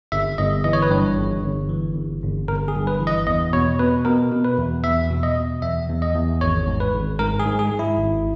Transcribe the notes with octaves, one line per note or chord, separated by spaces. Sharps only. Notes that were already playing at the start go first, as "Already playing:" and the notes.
G1 E5
G1 D#5
E3 D#5
C#5
B4
G2 C#5
G1
G1
E3
G1
G1
G1 A#4
G#4
G2
B4
E3
D#5
E2 D#5
B2 C#5
B2 B4
B2 A#4
B2
B4
E2
E2 E5
B2
D#5
B2
E2 E5
E2
D#5
E2
G#1 C#5
G#2
B4
G#1
G#2 A#4
G#4
G#2
G#4
G#2
E4
G#1